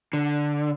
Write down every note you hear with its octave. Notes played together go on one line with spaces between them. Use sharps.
D3